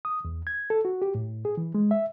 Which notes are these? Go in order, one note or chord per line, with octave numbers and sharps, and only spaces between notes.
D#6
E2
G#6
A4
F#4
G4
A2
G#4
E3
G#3
E5